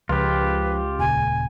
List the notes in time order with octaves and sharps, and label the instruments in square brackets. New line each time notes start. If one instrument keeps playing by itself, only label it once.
[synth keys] C#2 [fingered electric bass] F3 [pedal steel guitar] F4 G4 [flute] B4
[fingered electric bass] D#1 A#2 C#3 [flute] G#5